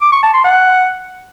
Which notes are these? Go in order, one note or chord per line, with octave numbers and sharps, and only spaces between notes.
D6
C#6
A5
C6
F#5